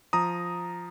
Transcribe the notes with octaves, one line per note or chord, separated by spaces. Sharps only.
F3 A#5 D#6